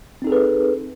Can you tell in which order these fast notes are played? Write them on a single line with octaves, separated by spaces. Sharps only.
C4 D#4 A4 G#4 B4